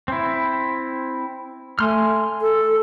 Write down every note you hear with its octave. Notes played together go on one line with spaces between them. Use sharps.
C4 E4
A3 G#5 C6 F6
A4